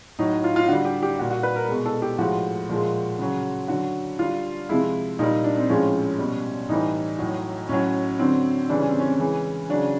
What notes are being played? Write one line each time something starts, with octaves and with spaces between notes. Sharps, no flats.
A2 F#3 D#4
F4
F4
D3 G3 F#4
G4
G4
A#2 G3 F#4
F#4
B4
A#4
B2 G#3
A4
G4
A2 F3 G#3 F#4
A#2 F3 G#3
C#3 F#3
D3 F#3 F#4
D3 G3 F4
C3 F3 G#3 E4
A#2 G3 D#4
D4
C4
A2 F3 G#3 C#4
B2 G3
A2 E3 G3 D#4
A2 F#3
A2 F#3 C#4
D3 F#3 C4
C#3 E3 G3 D4
C#4
C4
C#4
C#3 E3 G#3
C#3 F#3 D4